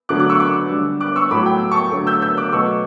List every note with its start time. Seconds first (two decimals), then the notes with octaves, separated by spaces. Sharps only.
0.09 D3 F#3 A3 D6 F#6
0.20 D6 F#6
0.29 C#6 E6
0.40 D6 F#6
0.70 D3 G3
1.00 D6 F#6
1.16 C#6 E6
1.31 A2 F#3 A3 B5 D6
1.46 G5
1.71 A5 C#6
1.92 D3 F#3 A3
2.07 E6 G6
2.22 E6 G6
2.37 D6 F#6
2.52 B2 F#3 A3 C#6 E6